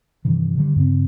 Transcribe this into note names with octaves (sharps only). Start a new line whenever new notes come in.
G2 C3 D#3 E3
D3 D#3 G3
G2 C#3 B3 C4